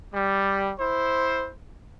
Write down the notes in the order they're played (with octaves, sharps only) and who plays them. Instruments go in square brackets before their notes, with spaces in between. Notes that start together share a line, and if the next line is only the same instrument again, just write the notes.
[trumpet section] G3
E4 C5